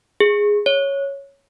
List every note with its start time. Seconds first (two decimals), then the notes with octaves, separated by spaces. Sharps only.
0.20 G#4
0.66 C#5